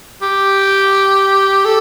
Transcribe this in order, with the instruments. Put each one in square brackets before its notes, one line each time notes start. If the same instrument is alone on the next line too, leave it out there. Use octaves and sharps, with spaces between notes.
[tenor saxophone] G4
A4